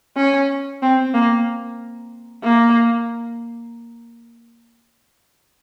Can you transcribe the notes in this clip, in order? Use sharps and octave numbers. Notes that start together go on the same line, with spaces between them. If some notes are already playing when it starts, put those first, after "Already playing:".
C#4
C4
A#3
A#3